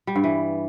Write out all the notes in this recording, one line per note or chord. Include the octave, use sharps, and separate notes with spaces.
G3
G2
E3